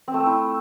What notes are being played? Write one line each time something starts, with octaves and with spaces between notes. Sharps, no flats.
C4
A3
C4
E4